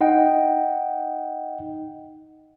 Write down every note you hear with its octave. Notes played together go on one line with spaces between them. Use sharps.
D#4 D#5 F#5 G5